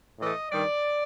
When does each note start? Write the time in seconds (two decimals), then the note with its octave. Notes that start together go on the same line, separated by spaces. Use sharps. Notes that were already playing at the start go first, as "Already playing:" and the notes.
0.19 A2 E3 A3 D#5
0.51 G2 D#3 G3 D5